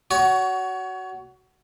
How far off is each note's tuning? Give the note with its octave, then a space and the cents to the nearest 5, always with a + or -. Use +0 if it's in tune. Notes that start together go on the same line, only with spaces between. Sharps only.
F#4 +15 C#5 +30